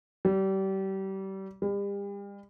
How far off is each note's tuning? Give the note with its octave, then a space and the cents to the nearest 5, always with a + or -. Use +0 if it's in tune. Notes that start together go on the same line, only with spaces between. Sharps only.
G3 -30
G3 +40